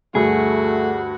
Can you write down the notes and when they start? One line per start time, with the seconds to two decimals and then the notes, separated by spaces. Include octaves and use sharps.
0.15 D2 G2 A3 F#4 G#4